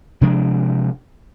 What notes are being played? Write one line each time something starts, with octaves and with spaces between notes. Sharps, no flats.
C3 F3 G#3 D4